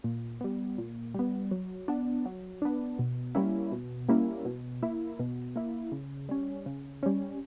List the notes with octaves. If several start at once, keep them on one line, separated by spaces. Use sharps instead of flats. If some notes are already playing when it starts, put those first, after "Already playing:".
A#2
G3 B3
A#2
G3 B3
F#3
B3 D4
F#3
B3 D4
B2
G3 A#3 C#4 E4
B2
G3 A#3 C#4 E4
B2
A#3 E4
B2
A#3 E4
C#3
G3 C#4
C#3
G3 C#4